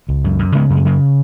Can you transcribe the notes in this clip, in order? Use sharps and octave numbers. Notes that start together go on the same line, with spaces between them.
C#2
F#2
F#2
C#3 G#3 B3
F#2
G#3
C#3 F#3 A#3